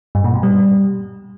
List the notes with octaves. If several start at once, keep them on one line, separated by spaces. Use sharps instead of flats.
G2
A#2
B2
G3